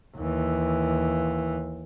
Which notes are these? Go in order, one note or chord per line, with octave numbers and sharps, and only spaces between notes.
D#2 E3